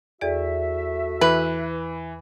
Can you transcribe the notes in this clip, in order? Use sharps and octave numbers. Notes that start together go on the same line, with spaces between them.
E2 A3 F#4 G#4 D5 E5
E3 B4